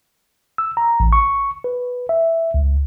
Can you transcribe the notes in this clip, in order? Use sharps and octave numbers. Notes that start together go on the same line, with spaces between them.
E6
A#5
A1
C#6
B4
E5
C#2